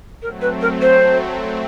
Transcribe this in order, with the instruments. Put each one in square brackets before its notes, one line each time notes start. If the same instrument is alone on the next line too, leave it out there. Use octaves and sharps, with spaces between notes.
[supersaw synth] F#3 A3 C4 [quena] A#4
[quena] B4
A#4
C5